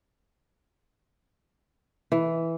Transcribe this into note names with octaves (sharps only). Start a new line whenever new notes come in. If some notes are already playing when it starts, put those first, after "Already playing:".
E3